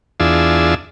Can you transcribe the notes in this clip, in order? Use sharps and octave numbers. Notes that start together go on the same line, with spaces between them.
E2 D4 F4 G#4 E6